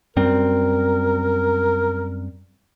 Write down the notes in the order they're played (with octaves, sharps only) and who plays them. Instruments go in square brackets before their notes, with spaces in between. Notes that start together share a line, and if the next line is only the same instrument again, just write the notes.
[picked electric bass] F#2 G3 C4 [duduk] A#4